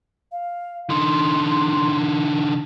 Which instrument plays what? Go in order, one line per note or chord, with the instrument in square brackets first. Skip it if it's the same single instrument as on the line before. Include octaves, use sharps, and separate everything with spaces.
[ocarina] F5
[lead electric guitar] D3 D#4 [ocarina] C6